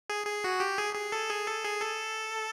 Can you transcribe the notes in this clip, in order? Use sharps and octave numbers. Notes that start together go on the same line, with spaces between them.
G#4
G#4
F#4
G4
G#4
G#4
A4
G#4
A4
G#4
A4